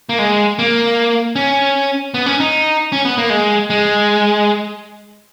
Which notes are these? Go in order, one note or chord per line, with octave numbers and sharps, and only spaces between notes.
A#3
G#3
A#3
C#4
B3
C#4
D#4
C#4
B3
A#3
G#3
G#3